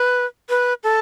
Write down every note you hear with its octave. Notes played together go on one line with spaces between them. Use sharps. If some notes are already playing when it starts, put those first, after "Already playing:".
Already playing: B4
B4
A4